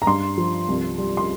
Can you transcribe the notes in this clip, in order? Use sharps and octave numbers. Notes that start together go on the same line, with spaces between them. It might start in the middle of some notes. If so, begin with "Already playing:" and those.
A#5
G2 C6
F3
C2
G3
C6